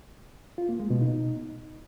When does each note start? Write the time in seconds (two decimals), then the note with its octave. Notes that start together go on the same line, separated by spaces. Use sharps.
0.58 F4
0.69 A#3
0.80 G#3
0.90 B2
1.01 D#4